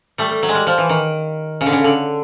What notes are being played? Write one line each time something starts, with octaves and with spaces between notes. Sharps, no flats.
G3 A3
G3
F#3
G#3
G3
F3
E3
D#3
C#3
D3
C#3
D3